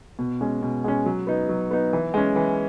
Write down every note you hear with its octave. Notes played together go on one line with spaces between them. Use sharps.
B2
G#3 C#4
B2
G#3 C#4
F#3
B3 D#4
F#3
B3 D#4
E3
G#3 C#4
E3